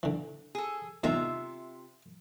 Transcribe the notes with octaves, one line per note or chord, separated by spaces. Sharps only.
D3 E3
G#4 A4
E2 C3 D#3 G#3 F4 E5